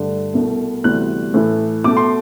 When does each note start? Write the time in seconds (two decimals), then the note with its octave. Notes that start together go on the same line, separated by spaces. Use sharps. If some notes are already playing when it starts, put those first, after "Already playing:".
Already playing: G2 D3 A3
0.34 C2 B2 A3
0.84 D2 C3 E3 G3 B3 F#6
1.34 A2 E3 A3
1.84 B2 A3 D6
1.97 C6